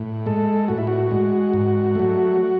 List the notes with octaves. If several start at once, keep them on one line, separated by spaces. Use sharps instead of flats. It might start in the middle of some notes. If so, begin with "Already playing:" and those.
Already playing: A2
G#3 A4
A2 F#4
E4
F#4
G#3
G#2
F#3 A3